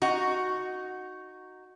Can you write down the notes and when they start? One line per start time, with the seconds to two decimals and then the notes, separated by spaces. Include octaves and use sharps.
0.02 D#4 F#4